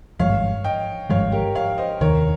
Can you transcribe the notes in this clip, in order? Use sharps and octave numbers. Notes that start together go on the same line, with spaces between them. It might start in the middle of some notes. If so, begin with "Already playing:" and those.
G#1 G2 F3 G#3 C#5 F5
D#5 G5
G#1 G2 F3 G#3 C#5 F5
G4 A#4
C#5 F5
C5 D#5
F1 D#2 D#3 A#4 C#5